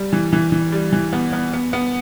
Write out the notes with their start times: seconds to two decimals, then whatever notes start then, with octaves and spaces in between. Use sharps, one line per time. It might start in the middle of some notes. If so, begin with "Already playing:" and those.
Already playing: G3
0.13 E3
0.33 E3
0.52 E3
0.72 G3
0.93 E3
1.13 B3
1.33 B3
1.53 B3
1.73 B3